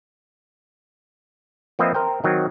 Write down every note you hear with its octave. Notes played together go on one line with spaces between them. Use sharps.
F3 A#3 C4 B4 D#5 E5
A#4 C5 G5
D#3 F#3 C4